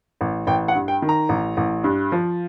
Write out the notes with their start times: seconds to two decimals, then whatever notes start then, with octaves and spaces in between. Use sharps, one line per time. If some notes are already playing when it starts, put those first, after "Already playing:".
0.21 A1
0.47 A1 G5
0.68 F#5
0.75 G2
0.88 G5
1.02 D#3
1.09 A#5
1.29 A1
1.57 A1
1.84 G2
2.12 F3